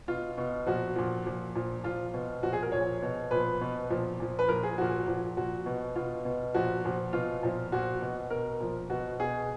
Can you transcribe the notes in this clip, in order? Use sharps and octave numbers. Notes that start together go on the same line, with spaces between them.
B2 F4
B2
A#2 F3 F#4
A#2 F3
A#2 F3
A#2 F3
A#2 F3 F4
B2
A#2 F3 F#4
G#4
A#4
A#2 F3 C#5
B2
A#2 F3 B4
B2
A#2 F3
A#2 F3
B4
A#2 F3 A#4
G#4
A#2 F3 F#4
A#2 F3
A#2 F3 F#4
B2
B2 F4
B2
A#2 F3 F#4
A#2 F3
B2 F4
A#2 F3
A#2 F3 F#4
B2
B2 A#4
A#2 F3
B2 F#4
B2 G#4